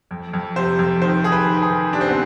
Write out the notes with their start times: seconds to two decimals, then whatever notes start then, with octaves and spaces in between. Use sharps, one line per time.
0.11 F2
0.33 F2
0.56 C3 C5
0.79 F2
1.02 D#3 C5
1.24 D#3 G#4
1.32 B4
1.48 D#3
1.62 G#4
1.70 D#3
1.93 C3 D4
2.01 C4
2.09 B3